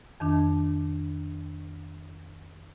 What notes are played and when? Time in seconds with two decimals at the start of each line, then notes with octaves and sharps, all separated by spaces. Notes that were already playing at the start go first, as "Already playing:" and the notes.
0.20 F2 D#3 D4